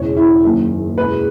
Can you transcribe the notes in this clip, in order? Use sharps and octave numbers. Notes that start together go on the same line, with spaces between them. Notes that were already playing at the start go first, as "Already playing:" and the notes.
Already playing: E1 E2 C#3 C#5
E4
F#1 F#2 D#3 A#3
F#1 E2 B2 G#3 B4